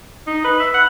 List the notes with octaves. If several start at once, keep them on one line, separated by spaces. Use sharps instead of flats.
D#4
B4
E5
F#5